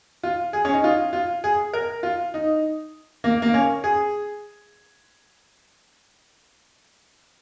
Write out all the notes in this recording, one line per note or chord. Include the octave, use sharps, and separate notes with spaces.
F4
G#4
C#4
D#4
F4
F4
G#4
A#4
F4
D#4
A#3
A#3
C#4
G#4